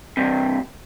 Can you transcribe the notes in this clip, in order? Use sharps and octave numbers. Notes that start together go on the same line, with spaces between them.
G2 C3